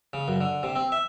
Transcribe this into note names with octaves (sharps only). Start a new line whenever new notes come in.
C#3
F#2
D3
C3
C4
E5